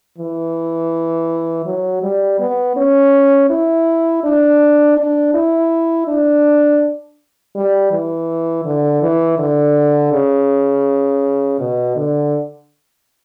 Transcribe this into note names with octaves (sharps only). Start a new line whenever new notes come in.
E3
F#3
G3
B3
C#4
E4
D4
D4
E4
D4
G3
E3
D3
E3
D3
C#3
B2
D3